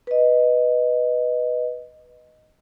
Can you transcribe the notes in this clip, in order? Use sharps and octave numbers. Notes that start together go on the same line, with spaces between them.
B4 D#5